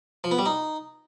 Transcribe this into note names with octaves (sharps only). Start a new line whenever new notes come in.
F3
B3
G3
D#4